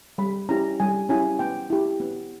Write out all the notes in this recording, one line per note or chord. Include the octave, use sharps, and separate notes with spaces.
G3 B5
C#4 E4 G4 A#5
G3 G#5
C#4 E4 G4 G#5
B3 G5
E4 G4
B3